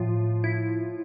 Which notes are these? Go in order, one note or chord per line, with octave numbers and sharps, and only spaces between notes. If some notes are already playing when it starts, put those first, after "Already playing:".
Already playing: A2 F3 F4
E4